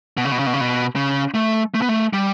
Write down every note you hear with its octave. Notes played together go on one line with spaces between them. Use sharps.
B2
C#3
B2
C#3
B2
C#3
B2
C#3
A3
A3
B3
A3
G3